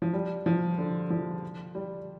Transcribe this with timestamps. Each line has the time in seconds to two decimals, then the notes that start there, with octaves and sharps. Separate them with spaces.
0.02 F3
0.13 G3
0.46 F3
0.78 D3
1.10 F3
1.75 G3